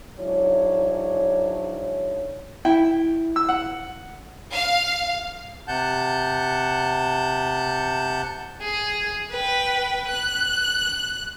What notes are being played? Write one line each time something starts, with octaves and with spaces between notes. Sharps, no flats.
G#2 F#3 D4 E4 C#5
E4 G5
E6
F#5
F5
C3 F#5 A5 G6
G#4
B4 G5
F#6